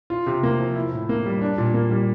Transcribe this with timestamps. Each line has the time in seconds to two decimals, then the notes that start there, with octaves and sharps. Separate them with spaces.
0.10 F4
0.26 C3
0.43 A#3
0.59 F3
0.75 E4
0.92 A2
1.09 A#3
1.26 G3
1.41 D4
1.58 A#2
1.74 A#3
1.91 G3